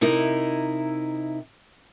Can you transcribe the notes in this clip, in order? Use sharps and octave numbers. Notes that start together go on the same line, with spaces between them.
C3 D#4 E4 A#4